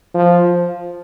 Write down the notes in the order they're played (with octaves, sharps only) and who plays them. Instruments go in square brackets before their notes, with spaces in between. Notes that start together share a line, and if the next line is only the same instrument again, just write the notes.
[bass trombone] F3